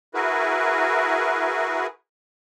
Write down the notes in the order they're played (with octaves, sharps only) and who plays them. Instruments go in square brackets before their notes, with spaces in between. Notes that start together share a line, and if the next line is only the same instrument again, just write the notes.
[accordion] E4 F#4 G#4 A#4 B4